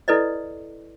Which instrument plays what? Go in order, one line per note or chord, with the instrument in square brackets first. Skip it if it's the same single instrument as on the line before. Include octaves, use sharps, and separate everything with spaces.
[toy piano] E4 A4 B4 D5 D#5